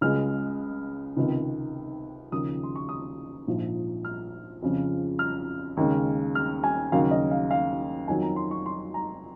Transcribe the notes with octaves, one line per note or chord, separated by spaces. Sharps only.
C#2 C#3 G#3 F6
C#2 C3 D#3
D#2 C#3 F3 D#6
C6
C#6
D#6
A#1 G#2 F3
F6
F2 C#3 F3
F6
D#2 C#3 G#3
F6
G#5
D#2 C#3 F#3 F5
D#5
F5
F5
F2 D#3 F#3 G#5
A#5
C6
C#6
C6
A#5